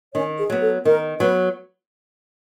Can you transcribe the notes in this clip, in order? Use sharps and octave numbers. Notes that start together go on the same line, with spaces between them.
D#3 C#4 C#5
G#4
F#3 B3
A4
D#3 A#4
F#3 B3 B4